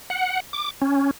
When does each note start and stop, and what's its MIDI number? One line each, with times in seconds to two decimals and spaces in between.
0.10 0.40 78
0.53 0.70 86
0.82 1.11 61